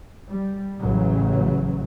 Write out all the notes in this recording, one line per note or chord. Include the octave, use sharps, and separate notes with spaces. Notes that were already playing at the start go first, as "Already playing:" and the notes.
G3
A1 C#3 F#3